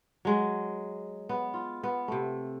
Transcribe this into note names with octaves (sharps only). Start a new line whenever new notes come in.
F#3 G#3
B3
F4
B3
C3 A3